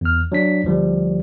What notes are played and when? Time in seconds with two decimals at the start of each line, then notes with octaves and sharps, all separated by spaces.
0.01 E2 F6
0.32 F#3 D4 B6
0.64 D2 F3 G3